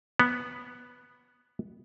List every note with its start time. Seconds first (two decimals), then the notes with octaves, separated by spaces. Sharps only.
0.20 B3